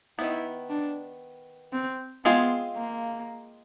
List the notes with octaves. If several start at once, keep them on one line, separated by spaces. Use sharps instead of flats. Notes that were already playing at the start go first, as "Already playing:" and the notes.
D#3 F#3 B3 E4
D4
C4
G#3 B3 C4 F4 G#4
A#3